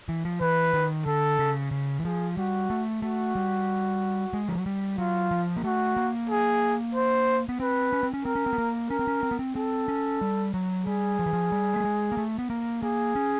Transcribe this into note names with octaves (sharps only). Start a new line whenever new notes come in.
E3
F3
E3 B4
D#3
D3 A4
C#3
C#3
E3
F3 G#4
G3 F#4
A3
A3 F#4
G3
G#3
F3
F#3
G3
F#3 F4
F3
A#3
A3 F#4
A#3
G#4
C5
B3
C4 B4
C#4
C4
C#4
C4 A#4
C#4
C4
B3
A#3
C#4 A#4
C4
C#4
C4
B3
C4
C4 A4
C#4
G3
F#3
G3 G#4
F3
E3
F3
G3
A3
G#3
A#3
A3
B3
A#3
A#3 G#4
C#4